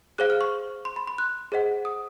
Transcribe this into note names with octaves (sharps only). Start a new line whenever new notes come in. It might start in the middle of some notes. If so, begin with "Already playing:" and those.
G#4 C5 F5 F#6
F6
C#6
C6
B5
C6
F#6
G#4 C5 D#5 F#5
D#6